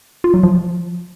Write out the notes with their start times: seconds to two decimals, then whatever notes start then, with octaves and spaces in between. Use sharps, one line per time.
0.24 F4
0.34 F#3
0.43 F3